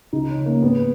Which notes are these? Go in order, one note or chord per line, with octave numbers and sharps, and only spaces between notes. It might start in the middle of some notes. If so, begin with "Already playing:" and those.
C#2 D#4
C#4
C#3
A#3
G#2 B3